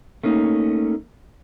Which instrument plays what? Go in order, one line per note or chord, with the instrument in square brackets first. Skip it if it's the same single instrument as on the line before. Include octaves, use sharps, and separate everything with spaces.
[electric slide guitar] A3 A#3 C#4 D#4